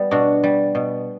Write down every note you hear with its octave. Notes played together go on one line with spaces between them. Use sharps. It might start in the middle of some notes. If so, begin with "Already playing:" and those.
Already playing: G3 B3
B2 D4 F#4
G3
B2